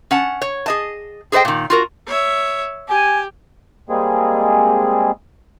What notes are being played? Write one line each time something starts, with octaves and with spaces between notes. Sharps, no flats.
C#4 F#5 A5
C#5
G#4 D#5 A5
G#4 A4 C5 D#5 G5
A#2 D#3
F4 F#4 A#4
C#5 E5
G4 G#5
G3 G#3 A#3 C4 G#4